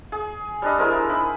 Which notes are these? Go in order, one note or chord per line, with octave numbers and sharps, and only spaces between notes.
G#4
G3 D4 D#5
E4 G#4 A#4 C5
D#4 B5